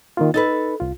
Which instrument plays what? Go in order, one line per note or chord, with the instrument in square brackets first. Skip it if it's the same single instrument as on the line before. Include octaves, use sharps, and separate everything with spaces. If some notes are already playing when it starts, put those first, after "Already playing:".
[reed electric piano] D#3 A#3 F4
[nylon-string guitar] D#4 A4 B4 [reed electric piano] A6
[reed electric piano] C2 F4